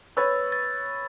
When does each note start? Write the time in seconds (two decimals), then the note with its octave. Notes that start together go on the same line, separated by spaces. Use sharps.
0.17 B4 C#5 B5 E6 A6
0.52 A6